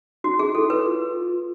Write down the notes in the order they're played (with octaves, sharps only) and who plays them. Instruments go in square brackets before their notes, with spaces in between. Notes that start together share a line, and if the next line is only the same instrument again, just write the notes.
[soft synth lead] D#4 [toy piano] F#4
[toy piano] G#4
[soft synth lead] E4 [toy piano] A4
[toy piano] B4
[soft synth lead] F4